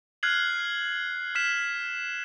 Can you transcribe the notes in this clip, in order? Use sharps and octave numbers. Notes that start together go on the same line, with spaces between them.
F6 F#6 G#6 C7 F#7
F6 B6 E7